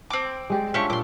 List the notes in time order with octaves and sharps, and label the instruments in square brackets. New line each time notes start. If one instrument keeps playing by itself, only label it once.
[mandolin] C4 D6
[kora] G#3 G4 D5
[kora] C#4 D4 F4 [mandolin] E4 G4 C#6
[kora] A#2 D5 [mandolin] C6 D6